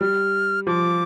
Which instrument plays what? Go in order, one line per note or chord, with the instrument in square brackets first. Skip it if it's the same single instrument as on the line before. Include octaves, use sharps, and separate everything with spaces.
[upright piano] G3 [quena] F6
[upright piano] F3 [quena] D6